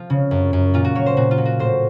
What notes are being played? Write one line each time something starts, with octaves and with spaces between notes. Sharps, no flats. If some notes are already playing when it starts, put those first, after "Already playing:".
Already playing: F3 F4
C#3
F#2
F#2
A#2 F4
F#4
F#3 C#5
C5
A#2 F#4
F4
F#3
F#4
A2 C5